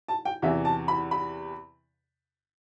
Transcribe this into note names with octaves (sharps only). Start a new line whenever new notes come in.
A5
G5
E2 C3 E3 E5
A5
B5
B5